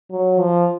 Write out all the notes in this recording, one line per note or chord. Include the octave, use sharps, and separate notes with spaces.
F#3
F3